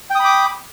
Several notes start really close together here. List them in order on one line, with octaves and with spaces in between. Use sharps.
G5 D#6 B5 D6